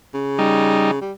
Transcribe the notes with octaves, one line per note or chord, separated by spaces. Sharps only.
C#3
G3 D#4
G3